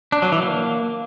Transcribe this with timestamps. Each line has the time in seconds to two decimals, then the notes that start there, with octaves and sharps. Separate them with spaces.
0.12 D4
0.22 F#3
0.32 E3
0.42 A#3